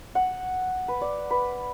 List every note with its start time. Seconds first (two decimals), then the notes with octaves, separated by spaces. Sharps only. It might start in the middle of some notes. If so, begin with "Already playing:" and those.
0.15 F#5
0.88 B4
1.01 D5
1.31 B4